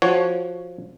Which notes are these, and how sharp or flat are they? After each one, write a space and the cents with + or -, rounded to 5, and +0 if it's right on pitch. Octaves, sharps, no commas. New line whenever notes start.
F3 +0 F#4 +0 C#5 +0